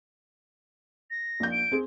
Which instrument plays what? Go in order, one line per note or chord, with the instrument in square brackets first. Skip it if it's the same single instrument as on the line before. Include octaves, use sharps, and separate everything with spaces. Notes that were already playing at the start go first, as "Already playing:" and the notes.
[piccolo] A#6
[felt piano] A#1 G6
[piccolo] D7
[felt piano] C4 G#4